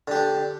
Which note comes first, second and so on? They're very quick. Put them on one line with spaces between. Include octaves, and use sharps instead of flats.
D3 G4 D4